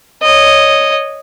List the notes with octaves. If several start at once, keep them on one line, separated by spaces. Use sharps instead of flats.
C#5 D#5